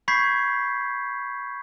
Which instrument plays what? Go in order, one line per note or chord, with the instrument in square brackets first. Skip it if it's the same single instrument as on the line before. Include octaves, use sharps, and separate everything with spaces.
[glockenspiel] B5 C#6 G6 G#6 B6 C7